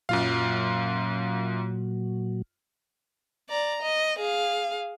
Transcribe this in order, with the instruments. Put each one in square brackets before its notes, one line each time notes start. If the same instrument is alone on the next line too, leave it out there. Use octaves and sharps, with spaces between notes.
[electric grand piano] F#2 F4 F5 [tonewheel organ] A#2 F#3
[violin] D5 A#5
D#5
G#4 F5